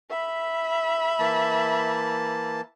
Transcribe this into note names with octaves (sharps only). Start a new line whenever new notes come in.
E5 B5
E3 A#3 A5